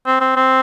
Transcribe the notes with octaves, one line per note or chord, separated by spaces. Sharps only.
C4
C4
C4